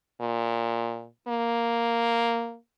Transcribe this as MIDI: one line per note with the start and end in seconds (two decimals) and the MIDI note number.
0.21 1.06 46
1.28 2.56 58